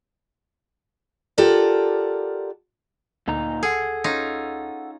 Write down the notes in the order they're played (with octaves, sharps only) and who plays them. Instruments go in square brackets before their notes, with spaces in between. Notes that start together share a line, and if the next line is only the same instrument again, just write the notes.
[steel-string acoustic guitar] F4 G4 A4 A#4 D5 F#5
[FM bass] D2 [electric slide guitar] A#2 D#4 A#5
[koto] G#4 [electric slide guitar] A4 F#5
[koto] C#4 D#4 F4